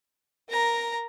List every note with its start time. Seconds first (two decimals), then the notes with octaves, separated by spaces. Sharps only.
0.50 A#4 A#5